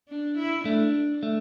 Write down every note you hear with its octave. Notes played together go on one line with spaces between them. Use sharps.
D4
E4
A3 D4
A3